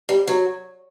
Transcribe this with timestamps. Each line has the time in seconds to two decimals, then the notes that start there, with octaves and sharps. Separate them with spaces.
0.09 G3
0.27 F#3